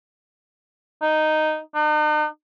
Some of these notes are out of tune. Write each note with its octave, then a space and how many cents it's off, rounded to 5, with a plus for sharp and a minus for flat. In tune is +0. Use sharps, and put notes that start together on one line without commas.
D#4 -5
D#4 -45